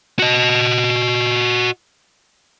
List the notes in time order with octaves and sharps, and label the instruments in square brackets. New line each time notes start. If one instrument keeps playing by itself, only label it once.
[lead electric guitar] F#4 D#5